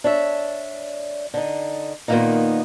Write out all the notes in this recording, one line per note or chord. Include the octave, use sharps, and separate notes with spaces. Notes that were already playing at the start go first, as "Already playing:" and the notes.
D4 C#5 E5
D3 D#4
A#2 D#3 G#3 A#3 B3 D#4